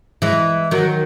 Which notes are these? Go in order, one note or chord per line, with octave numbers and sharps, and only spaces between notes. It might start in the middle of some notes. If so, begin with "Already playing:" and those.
E3 G#3
D#3 F#3